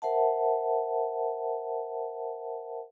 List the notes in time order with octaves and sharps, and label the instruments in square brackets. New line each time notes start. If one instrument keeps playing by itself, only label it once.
[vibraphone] A#4 C5 E5 F#5 A5